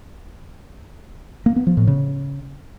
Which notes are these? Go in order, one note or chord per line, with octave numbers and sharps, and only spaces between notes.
A#3
B3
F3
A2
C#3